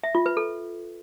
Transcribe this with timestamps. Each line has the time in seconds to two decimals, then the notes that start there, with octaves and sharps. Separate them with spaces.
0.04 E5
0.15 F4
0.26 B4
0.37 A4